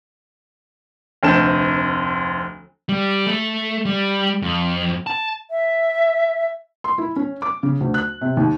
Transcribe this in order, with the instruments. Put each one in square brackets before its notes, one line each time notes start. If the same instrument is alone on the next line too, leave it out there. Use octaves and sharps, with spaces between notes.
[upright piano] F1 D2 C4 A5 E7
[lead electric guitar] G3
A3
G3
F2
A5
[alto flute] E5
[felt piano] C6
E4
C#4
D6
C#3
D2
F#6
C3
D#2